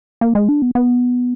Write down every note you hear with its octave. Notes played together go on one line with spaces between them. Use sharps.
A#3
G#3
D4
B3
B3